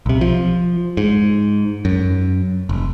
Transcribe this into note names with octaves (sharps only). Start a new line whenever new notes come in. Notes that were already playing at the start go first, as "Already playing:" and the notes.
B1 C3
F3
G#2
F#2
F1